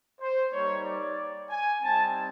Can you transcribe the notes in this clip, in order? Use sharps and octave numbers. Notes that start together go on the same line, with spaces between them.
C5
G3 A#3 D#4 C#5
D5
G#5
G3 C4 D#4 A5